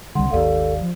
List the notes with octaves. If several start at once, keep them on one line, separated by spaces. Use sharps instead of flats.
C2 D3 G3 F#5 C6
G#1 D#2 G4 A4 D5 F5
F3